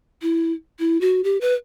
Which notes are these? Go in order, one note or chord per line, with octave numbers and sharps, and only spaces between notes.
E4
E4
F#4
G4
B4